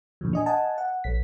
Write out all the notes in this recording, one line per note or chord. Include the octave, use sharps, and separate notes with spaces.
A#2 D3 E3 F3
D4 D#5 G#5
D#5 F#5 G#5 A5
F#5
A#1 B6